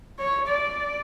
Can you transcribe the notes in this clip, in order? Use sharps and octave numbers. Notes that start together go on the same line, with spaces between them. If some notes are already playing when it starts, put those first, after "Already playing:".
C#5
D5